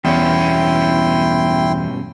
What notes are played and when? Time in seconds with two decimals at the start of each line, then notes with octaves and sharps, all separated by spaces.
0.05 E2 G2 B2 C#4 E4 G5 C6